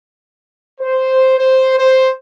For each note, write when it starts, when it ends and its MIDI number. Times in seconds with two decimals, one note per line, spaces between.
0.80 1.38 72
1.38 1.75 72
1.78 2.09 72